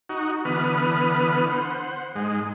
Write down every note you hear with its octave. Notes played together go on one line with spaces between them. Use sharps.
D#4 F#4
D3 E3 B3 B4 D#6 F6
C5 F#5
G#2 G#3